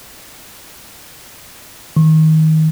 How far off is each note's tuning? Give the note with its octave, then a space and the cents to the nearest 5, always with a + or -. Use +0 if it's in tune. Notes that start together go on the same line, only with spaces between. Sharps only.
D#3 +20